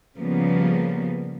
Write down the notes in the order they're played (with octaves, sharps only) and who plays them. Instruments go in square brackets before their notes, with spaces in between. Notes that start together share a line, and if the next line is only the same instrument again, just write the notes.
[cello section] C#3 F3 G3 A#3 B3